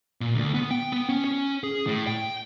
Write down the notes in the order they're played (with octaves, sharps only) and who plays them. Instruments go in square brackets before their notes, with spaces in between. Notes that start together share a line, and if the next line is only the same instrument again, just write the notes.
[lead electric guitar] A#2
D2
B3
G5
B3
C#4
C#4
G#4
A2
G5